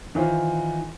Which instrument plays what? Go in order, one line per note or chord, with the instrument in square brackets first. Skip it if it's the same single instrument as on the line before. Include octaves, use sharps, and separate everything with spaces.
[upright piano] D#3 E3 F4 C5